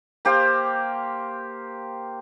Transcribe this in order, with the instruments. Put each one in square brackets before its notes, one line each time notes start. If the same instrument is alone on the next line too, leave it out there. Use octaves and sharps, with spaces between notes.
[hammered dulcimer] A#3 G4 C5 F5